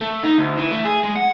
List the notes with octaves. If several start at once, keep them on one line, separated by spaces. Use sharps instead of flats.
A3
D#4
D2
E3
A3
G#4
G#3
F#5